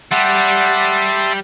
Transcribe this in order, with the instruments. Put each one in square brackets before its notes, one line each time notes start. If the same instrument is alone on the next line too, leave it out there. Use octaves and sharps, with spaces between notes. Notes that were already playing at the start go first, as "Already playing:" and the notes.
[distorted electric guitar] G3 G4 [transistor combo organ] E5 A5 C6 [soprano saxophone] F#5